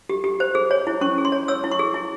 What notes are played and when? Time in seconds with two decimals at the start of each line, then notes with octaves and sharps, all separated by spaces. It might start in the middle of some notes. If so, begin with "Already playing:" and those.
0.09 G4
0.24 G4
0.40 C5
0.55 G#4
0.71 C#5
0.87 E4
1.01 C#4 C#6
1.18 G#4
1.25 C6
1.32 C#5
1.48 C#5 E6
1.64 E4
1.72 C#6
1.79 G#4
1.94 E4